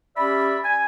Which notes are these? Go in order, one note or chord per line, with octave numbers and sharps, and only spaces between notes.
C#4 G4 D5 E5 B5
G#5